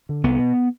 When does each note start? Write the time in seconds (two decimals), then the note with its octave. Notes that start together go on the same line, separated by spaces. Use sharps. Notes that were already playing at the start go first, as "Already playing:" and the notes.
0.09 D3
0.23 C2 B3
0.39 B2